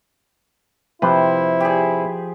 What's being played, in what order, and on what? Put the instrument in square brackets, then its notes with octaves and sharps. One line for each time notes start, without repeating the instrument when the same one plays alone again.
[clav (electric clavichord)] C3 B4 [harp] F3 [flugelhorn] E4
[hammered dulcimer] G4 G#4